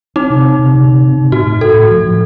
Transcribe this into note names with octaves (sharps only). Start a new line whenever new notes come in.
C4 D#4
C3
C4
C3
C3
C3
C4
C3
A2 F#4
A2
A2 A4
A2
F3
F3